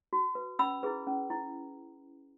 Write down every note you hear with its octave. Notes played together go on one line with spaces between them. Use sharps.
F#4
B4
C#4 B5 E6
E4 G#4 B4
C#4
E4